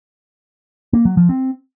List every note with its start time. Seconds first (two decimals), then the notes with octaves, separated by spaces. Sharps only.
0.93 A#3
1.05 F#3
1.17 F3
1.29 C4